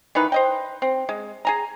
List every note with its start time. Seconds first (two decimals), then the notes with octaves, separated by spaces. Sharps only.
0.15 D#3 E3 D#4 B4
0.32 C5 D#5 G5
0.82 C4
1.09 G#3
1.45 G#4 G#5 A#5